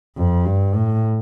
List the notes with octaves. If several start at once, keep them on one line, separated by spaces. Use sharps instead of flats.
F2
G2
A2